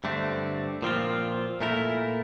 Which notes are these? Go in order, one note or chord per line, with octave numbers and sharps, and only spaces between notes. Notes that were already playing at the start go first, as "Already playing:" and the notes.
G2 D3 A3 C4
A#2 F3 C4 F4
A#2 A3 E4 A#4